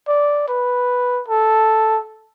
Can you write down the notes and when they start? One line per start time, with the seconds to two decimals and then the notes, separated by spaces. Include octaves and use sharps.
0.08 D5
0.48 B4
1.28 A4